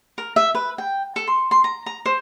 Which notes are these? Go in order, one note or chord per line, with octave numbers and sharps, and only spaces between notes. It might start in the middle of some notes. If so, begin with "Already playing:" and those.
A#4
E5
B4
G5
A4
C6
C6
A#5
A#5
C5